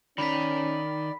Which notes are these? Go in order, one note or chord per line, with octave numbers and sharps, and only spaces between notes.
D#3 C#4 D5 A#5 B5 B6